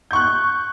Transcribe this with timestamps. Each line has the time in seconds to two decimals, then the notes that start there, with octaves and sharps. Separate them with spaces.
0.11 G6
0.13 C#6
0.16 F#6